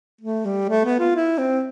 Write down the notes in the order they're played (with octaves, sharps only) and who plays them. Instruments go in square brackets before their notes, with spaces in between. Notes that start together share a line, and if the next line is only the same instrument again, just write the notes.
[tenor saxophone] A3
G3
A3
B3
F4
E4
C4